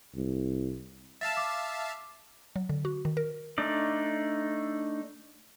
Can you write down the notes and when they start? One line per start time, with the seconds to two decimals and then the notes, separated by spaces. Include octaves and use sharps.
0.16 C2
1.21 E5 F5 A5 A6 E7
1.37 D6
2.56 F#3
2.69 D3
2.85 F#4
3.05 D#3
3.17 A#4
3.58 A3 D4 D#4 D5